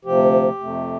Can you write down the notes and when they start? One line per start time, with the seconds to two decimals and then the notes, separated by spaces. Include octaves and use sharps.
0.05 D2 C3 F3 G4
0.60 F2 C3 A3